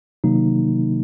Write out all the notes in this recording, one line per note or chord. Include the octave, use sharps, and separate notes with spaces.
C3 D#3 F#3 A#3 D#4